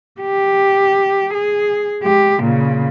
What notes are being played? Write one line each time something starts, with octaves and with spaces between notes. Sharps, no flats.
G4
G#4
G#3 G4
A#2 C#3